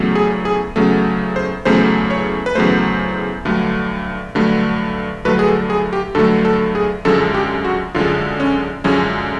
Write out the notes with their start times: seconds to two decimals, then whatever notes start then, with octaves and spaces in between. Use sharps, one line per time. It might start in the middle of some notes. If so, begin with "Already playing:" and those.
Already playing: E2 C#3 F#3 A3
0.15 G#4
0.45 G#4
0.76 E2 C#3 F#3 A3
1.36 C5
1.65 E2 C#3 F#3 A3 C5
2.10 C#5
2.46 B4
2.55 E2 C#3 F#3 A3 C5
3.45 G2 D3 F#3 A3
4.35 G2 D3 F#3 A3
5.25 G2 D3 F#3 A3 B4
5.39 G#4
5.47 A4
5.70 G#4
5.93 G4
6.15 G2 D3 F#3 A3 A4
6.45 A4
6.75 G#4
7.05 F#2 D3 F3 G#3 A4
7.34 G4
7.65 F#4
7.95 F#2 D3 F3 G#3 F4
8.40 C#4
8.84 F#2 D3 F3 G#3 C#4